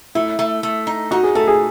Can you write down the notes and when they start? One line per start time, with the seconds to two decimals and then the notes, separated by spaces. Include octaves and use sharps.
0.15 A3 E4
0.39 A3
0.63 A3
0.87 D#4
1.11 D#4 F#4
1.23 G#4
1.35 A3 A4
1.47 G#4